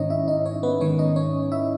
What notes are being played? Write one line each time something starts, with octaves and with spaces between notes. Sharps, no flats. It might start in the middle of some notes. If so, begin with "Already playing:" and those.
Already playing: G#2 D#3 C#4 D#4 C#5 D#5
E4 E5
D#4 D#5
C#4 C#5
B3 B4
G#2 D#3 C#4 C#5
D#4 D#5
C#4 C#5
E4 E5